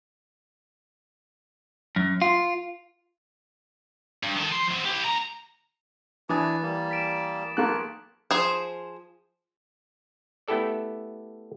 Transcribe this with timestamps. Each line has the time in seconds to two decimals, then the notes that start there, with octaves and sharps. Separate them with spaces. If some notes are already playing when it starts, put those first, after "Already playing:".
1.96 F#2
2.22 F4
4.23 G2
4.37 D#3 A4
4.51 F3 C6
4.71 C4 F#4
4.85 E4 G4
5.04 D2 A#5
6.29 E3 D4 E4 B4 G#5 D6 D#6 A6
6.63 G3 A#3
6.91 B6 D7 E7
7.57 B1 A#3 A5 F#6
8.31 F3 G#4 C5
10.48 A3 B3 E4 G4 A4 D5